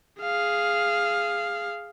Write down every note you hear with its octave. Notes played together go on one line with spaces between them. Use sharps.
G#4 F5